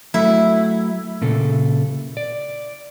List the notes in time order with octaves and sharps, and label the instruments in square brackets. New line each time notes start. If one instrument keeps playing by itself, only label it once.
[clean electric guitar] F#3 A3 [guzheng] E4
[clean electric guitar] A#2 C#3 A4
D5